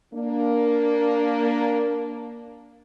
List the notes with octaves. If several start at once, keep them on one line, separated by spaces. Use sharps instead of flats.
A#3 D4